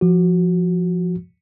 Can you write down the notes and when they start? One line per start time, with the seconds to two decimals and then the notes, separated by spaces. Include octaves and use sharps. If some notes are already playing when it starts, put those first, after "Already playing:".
0.01 F3 F#4